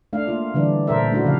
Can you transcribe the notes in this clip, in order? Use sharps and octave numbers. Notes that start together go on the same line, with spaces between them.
A3 D4 F5
A#3 F4
D3 E3 G3 D4
A#2 A4 A#4 C5 E5
A3 D4 E4 F#4
C#3 F3 F5